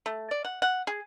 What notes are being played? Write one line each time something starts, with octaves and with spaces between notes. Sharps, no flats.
A3
D5
F#5
F#5
G#4